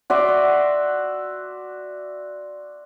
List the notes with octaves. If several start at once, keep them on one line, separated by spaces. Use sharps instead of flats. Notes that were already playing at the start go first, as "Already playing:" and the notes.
F#4 D5 E5 C6